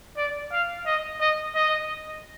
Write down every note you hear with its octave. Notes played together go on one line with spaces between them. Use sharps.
D5
F5
D#5
D#5
D#5